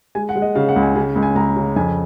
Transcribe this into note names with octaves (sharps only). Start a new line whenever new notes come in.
G#3 G#5
F#5
G#3
D#5
C#3 F5
F#5
C#2
G#5
C#3 G#5
C#2
G#5
C#2 A#5
C#3
F2 G#5